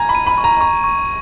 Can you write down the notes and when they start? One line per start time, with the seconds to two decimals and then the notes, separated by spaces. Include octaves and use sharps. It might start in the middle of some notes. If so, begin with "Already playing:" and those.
Already playing: G#5 A#5 G#6
0.09 B5
0.15 D#7
0.26 B5
0.38 C#6
0.44 A#5
0.61 A#5 C#6
0.84 C#6